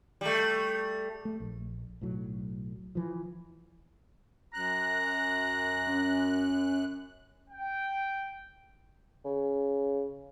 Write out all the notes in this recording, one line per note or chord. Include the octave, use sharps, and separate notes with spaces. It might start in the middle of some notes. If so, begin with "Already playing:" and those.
G3 A3
A3
A#1
B1 A2 F#3
E3 F3
F#2 A#5 F#6
C#4
G5
C#3